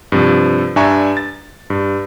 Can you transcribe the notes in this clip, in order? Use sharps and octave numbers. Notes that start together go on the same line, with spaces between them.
G2 C3 F3
G2 D4 E5 G#5 A#5 C#6
A6
G2